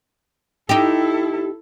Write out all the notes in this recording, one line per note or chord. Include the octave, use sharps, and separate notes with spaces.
D#4 E4 G4 A4